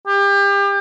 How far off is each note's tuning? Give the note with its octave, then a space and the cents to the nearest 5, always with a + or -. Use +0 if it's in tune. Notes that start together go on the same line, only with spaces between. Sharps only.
G4 +30